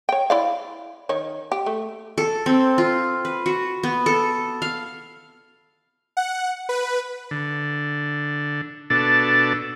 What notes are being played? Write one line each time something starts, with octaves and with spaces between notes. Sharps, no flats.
C#5 G5
E4 D5 F5
D#3 C#5
G4
A3
A4
C4
F4
B4
F#4
B3
A4
F5
F#5
B4
D3
B2 D4 A4